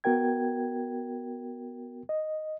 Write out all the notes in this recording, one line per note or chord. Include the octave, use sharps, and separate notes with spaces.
B3 F#4 A#4 G5 G#6
D#5